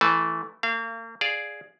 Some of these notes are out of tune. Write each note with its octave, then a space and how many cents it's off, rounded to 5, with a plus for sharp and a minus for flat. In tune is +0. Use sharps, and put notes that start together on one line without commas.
E3 +0 A3 +0 A5 -30
A#3 -40 F5 -30
G#4 +0 D5 +0 F5 +0